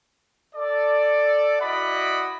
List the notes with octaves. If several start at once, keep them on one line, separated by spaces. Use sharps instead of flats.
A4 D5
E4 F#4 D5 D#5 F#5 B5